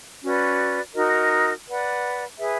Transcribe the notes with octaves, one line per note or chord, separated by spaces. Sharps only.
C#4 F#4 B4 D5
D#4 F#4 A#4 D#5
B4 D5 F#5
G#4 B4 E5